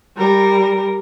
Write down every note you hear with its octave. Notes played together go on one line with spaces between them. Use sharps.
G3 A#4